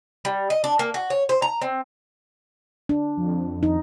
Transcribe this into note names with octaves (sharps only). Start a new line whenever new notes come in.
G3
D#5
D4
A#3
F#4
C#5
C5
A#5
C4
D4
F2
D#4